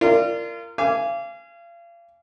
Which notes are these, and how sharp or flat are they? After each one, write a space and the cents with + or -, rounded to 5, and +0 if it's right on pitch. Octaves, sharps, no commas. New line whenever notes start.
F4 -30 A#4 -20 D5 +0
F5 -35 G#5 +0 D6 -20